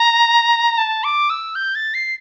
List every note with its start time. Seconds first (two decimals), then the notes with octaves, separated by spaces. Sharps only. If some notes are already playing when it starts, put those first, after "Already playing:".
Already playing: A#5
0.78 A5
1.04 D6
1.30 E6
1.55 G6
1.75 A6
1.94 C7